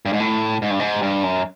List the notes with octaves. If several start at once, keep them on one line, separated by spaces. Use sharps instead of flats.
G2
G#2
A2
G#2
G2
G#2
G2
F#2